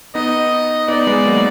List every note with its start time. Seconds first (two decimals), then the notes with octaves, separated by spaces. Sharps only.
0.15 B3 D#4 D#5
0.88 B3 D#4 D5
1.07 G#3 B3
1.26 F#3 A#3